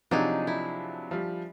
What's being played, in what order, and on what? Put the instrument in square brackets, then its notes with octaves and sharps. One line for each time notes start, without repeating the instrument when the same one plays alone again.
[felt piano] C3 F3 F#3 [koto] D4 D#4 G#4
[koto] E4
[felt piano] F3 G3